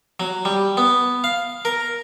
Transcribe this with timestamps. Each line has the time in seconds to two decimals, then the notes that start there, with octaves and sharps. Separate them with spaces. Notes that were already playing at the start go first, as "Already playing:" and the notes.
0.20 F#3
0.45 G3
0.77 B3
1.24 F5
1.65 A#4